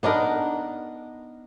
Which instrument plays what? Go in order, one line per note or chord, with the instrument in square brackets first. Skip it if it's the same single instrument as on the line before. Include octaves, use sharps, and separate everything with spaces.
[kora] B3 D4 D#4 A#4